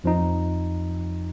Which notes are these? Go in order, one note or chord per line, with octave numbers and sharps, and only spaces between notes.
F2 F3 D#4